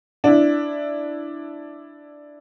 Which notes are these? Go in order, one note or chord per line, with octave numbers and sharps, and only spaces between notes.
D4 E4